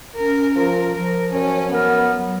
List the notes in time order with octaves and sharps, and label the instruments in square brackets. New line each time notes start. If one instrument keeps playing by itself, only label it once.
[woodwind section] C#4 [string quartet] A#4
[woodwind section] F3 [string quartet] A#4
[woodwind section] F3 [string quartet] A#4
[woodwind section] F#2 [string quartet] C#4
[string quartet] B3 [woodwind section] A#4
[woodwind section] F#3